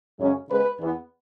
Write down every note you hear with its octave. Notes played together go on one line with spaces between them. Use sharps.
F#2 C#3 G#3 C#4
C#3 G#3 B3 B4
E2 E3 B3